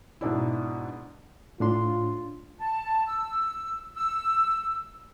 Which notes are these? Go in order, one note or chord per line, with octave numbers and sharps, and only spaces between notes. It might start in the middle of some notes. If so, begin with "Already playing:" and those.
G#2 B2 D4 E4
A2 D4 F4 C6
A5
E6
E6